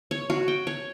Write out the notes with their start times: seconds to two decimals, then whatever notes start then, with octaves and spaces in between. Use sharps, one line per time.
0.11 C#5
0.30 F#4
0.48 G5
0.67 C#5